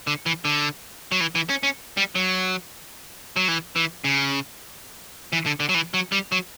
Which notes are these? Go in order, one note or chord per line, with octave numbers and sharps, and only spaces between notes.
D3
E3
D3
F#3
E3
E3
C#4
C#4
G3
F#3
F#3
E3
E3
C#3
E3
D3
D3
F#3
E3
F#3
G3
F#3